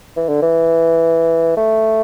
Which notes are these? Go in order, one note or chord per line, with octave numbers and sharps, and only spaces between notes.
E3
D3
E3
A3